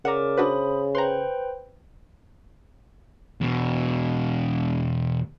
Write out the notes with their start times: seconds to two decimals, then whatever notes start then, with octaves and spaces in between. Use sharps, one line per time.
0.05 C#3 A#4 D5 F#5 A#5 D6
0.37 D4 F#4 B4 C5 B5 D#6
0.95 B4 C5 G5 A#5 C6
3.41 E2 B2